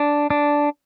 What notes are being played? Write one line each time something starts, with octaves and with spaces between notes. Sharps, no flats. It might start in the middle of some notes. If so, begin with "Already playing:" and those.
Already playing: D4
D4